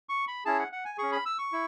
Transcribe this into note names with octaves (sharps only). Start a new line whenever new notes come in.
C#6
B5
C#4 E4 G#4 A5
F#5
F#5
G#5
C#4 G#4 C#6
B5
E6
C#6
E4